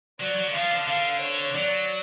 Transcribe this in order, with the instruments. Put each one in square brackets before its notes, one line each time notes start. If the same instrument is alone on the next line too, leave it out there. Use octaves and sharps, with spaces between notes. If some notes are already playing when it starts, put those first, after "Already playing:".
[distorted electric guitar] F#3 [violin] D5
[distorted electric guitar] F#3
D3
[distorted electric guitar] F3 [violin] F5
[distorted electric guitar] D3
[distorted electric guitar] D3 [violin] F5
[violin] C#5
[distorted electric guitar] F#3 [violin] D5